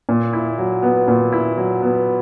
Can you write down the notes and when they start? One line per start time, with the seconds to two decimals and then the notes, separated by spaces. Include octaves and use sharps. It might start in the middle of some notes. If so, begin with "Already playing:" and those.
0.09 A#2
0.33 E4
0.58 F#3
0.83 B3
1.08 A#2
1.32 E4
1.58 F#3
1.82 B3